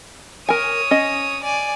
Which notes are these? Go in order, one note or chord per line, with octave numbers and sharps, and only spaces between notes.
A#4 C#5 G#5 D#6
C#4 D#5
D5 G#5